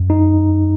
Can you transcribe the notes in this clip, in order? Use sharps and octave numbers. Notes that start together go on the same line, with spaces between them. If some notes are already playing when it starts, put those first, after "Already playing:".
Already playing: F#2
D#4